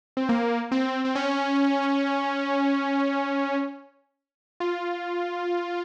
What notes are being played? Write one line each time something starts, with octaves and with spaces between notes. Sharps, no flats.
C4
A#3
C4
C4
C#4
F4